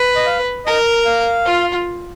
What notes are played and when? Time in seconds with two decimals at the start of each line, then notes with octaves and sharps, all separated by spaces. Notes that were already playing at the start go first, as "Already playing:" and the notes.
Already playing: B4
0.16 D#5
0.26 F5
0.66 A#4 D#5
1.05 F5
1.46 F4